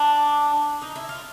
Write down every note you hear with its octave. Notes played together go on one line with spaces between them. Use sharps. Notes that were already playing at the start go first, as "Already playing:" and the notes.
Already playing: D4
D#4
E4
F4